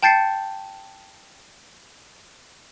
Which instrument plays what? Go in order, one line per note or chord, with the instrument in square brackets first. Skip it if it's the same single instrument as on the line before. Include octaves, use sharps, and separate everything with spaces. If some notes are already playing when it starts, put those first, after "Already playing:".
[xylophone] G5 A5 G6 A6 C7 C#7